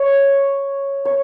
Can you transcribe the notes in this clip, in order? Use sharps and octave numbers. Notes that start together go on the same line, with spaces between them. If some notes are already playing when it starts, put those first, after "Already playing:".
Already playing: C#5
C#5